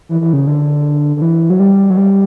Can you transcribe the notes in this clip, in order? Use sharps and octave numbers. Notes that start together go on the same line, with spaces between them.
E3
E3
C#3
D3
D3
E3
F#3
G3
F#3
G3